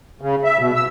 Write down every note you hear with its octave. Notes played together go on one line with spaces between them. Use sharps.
C#3
E5
B2
E6